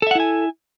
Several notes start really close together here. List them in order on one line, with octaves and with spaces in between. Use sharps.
A4 E5 F#5 E4 G#5